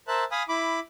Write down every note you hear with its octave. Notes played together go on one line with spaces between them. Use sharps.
A#4 C5 E5 A5 F#6
F5 G#5 B5 D#6
E4 B5 D6